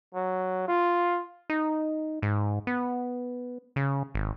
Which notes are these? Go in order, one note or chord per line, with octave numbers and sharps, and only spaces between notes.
F#3
F4
D#4
G#2
B3
C#3
G#1